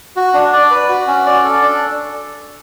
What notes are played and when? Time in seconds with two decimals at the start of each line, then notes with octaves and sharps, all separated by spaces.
0.16 F#4
0.34 D4
0.53 D5
0.71 B4
0.89 F#4
1.08 C#4
1.26 D5
1.44 A4
1.62 D4